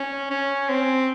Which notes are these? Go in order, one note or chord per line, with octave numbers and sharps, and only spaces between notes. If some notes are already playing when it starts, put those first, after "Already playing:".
Already playing: C#4
C#4
C4